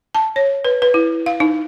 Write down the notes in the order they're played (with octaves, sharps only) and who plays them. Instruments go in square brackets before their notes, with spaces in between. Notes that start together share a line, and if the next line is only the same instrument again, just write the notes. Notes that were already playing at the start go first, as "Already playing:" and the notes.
[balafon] A5
C#5
B4
B4
E4
F5
D#4